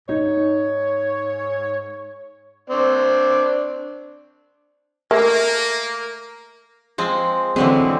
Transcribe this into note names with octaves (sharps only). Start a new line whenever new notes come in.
G#2 D#4 C#5
C4 D4 D5
A3 A#3 A#4
F3 G#3 C4
D3 E3 F#3 G#3 C4